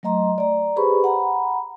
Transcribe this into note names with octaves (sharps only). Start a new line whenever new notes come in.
F#3 A3 D#5 A#5 C6
D5 A#5
G4 G#4 B4 C5 B5 C#6
F#5 A#5 B5